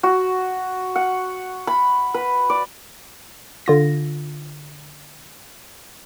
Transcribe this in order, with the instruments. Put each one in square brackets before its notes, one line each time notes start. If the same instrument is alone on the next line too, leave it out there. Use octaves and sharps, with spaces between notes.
[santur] F#4
F#5
B5
B4
D5
[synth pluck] D3 F4 A#6